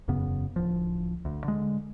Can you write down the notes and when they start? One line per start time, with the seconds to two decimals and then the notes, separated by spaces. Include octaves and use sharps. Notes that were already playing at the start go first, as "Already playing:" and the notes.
0.08 E1 F#2 C#3 B3
0.56 D1 F3
1.25 D2
1.44 D3 G#3